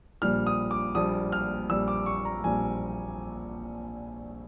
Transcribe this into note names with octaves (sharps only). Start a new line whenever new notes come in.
A#1 A#2 G3 F6
D#6
D6
A#1 A#2 G3 D#6
F6
A#1 A#2 G3 E6
D6
C#6
A#5
A#1 A#2 G3 G#5